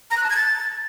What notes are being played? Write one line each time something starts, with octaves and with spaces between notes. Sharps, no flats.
A#5
F#6
A5
G#6
A6